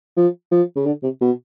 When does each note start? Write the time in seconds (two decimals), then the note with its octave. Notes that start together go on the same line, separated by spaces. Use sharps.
0.17 F3
0.52 F3
0.76 C#3
0.86 D3
1.03 C3
1.21 B2